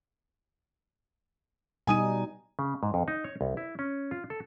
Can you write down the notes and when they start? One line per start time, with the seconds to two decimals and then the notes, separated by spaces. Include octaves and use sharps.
1.87 B2 G3 D#4 G#5 D#6 D#7
2.59 C#3
2.83 G#2
2.94 F2
3.08 D#4
3.24 C#5
3.41 C2
3.57 E4
3.79 C#4
4.11 F4
4.30 A4